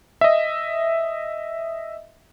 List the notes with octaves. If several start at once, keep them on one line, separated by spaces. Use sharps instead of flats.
D#5 E5